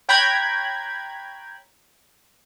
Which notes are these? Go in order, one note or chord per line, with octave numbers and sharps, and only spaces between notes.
C#5 G5 A#5 B5 F#6 G#6